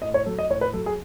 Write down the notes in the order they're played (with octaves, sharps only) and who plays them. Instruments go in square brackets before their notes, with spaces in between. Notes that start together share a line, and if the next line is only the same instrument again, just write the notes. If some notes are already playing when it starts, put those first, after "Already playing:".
[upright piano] A2 D#5
C#5
F#3 A4
D#5
A2 C#5
B4
F#3 A4
G#4